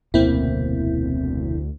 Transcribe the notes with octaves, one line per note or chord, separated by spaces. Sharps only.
F1 D2 B2 A#3 C4 E4